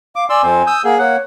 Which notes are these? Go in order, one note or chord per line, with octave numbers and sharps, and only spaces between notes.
F5 D6
D5 G#5 C6 E6
F2 C4 C5
D#6 E6 G6
A#3 G#4 F#5
A#3 C#5 F#5